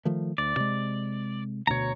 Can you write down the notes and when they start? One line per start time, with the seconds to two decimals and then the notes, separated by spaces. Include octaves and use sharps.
0.05 D#3 F3 A3
0.38 D2 D5
0.56 C3 G#3
1.67 D2 B2 C#5 A#5